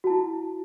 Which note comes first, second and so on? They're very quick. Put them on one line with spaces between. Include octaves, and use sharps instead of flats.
F#4 A5 E4